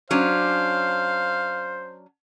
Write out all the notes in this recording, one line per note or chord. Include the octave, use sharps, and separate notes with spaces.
F#3 C#4 D4 C5 F5